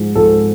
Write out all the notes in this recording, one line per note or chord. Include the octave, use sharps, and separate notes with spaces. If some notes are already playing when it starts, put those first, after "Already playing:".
Already playing: G#2 F3 G#3
G#2 F3 G#3 A4